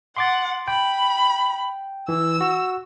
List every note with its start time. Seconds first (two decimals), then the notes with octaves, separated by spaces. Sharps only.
0.17 F#5 C6 D6 A6
0.68 G5 B5
2.09 E3 E6
2.41 F#4